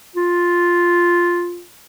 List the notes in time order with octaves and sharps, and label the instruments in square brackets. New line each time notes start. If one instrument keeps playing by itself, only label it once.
[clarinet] F4